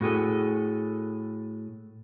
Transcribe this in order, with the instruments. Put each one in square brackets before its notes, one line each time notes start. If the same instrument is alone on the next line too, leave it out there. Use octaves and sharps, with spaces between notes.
[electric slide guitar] A2 F#4 G#4 A4